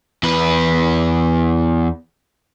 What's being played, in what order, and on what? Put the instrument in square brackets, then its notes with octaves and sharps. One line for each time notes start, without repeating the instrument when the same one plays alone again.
[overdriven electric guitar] E2 B4